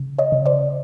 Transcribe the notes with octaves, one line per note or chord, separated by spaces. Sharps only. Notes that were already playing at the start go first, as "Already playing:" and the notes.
Already playing: C#3
C#5 D#5
C#3
C5 D5